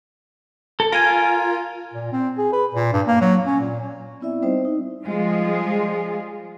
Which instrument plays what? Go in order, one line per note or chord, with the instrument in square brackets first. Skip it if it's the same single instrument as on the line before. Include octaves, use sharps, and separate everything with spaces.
[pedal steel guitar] A4
[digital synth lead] F4 [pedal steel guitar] A#4 G#5
[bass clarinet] A#2
C4
G#4
B4
A#2
G2
A#3
F#3
C#4
A#2
[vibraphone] B3 C4 E4 D5 E5
G3 C4 D#4 C5 D#5
D#4
[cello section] F3 G3 G#3 F4 G#4